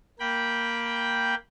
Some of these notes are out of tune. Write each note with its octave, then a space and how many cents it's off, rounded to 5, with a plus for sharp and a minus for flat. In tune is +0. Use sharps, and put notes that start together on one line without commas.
A#3 +0 G5 +0 B5 -15